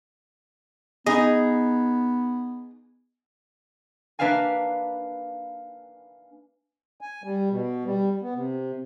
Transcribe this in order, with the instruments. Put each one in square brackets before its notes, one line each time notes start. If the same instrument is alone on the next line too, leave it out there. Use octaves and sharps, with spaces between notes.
[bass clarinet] B3 [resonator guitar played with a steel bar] D#4 G#4 [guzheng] D#5
[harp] A#3 D4 B4 E5 F5 G#5
[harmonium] G#5
G3
B2
G3
B3
C3